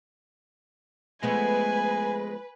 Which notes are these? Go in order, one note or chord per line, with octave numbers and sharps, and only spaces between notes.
F3 G#3 A3 B3 B4 G#5